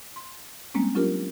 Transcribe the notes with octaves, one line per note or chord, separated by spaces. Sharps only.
C6
G3 G#3 A#3 C4 C#4
F#3 C#4 D4 F4 G4 A#4